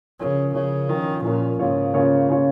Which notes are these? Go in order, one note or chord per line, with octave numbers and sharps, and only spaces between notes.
C#3 F3 C#4 A#4 C#5
C#3 F3 C#4 A#4 C#5
D#3 F3 C#4 A#4 C#5
A#2 F3 C#4 A#4 C#5
G#2 C#3 A#3 F4 C#5
C#3 A#3 F4 C#5
C#3 A#3 F4 C#5